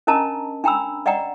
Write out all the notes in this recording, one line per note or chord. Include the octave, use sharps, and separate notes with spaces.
C#4 D4 A#4 D#5 A5 A#5
D4 G5 A#5 B5 E6
D5 D#5 F#5 G5 A#5